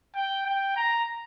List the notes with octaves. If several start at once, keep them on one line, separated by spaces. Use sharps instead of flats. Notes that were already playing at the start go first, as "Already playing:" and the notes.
G5
G5
A#5